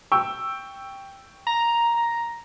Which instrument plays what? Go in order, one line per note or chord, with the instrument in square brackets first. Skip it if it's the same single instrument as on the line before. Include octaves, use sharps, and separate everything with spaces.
[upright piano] G5 C#6 E6
[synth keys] A#5